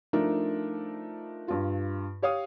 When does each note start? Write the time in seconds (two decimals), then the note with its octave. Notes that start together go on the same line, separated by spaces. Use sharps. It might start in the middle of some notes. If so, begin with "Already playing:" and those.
0.13 F3 A3 D4 D#4 A#4
1.48 G2 F4
2.22 G4 C#5 F5 D#6